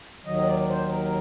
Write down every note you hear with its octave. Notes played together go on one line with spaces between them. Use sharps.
D#2 D#3 F#3 D#5
D5
C5
A#4